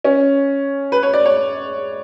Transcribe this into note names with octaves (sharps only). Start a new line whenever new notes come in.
C#4
B4
C#5
D5
C#5